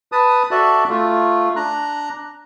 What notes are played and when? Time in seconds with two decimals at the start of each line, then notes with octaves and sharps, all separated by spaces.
0.12 B4 A5 D#6
0.51 F#4 A4 D5 E5 A5 F#6
0.89 A3 F4
1.56 D4 A#5 F#6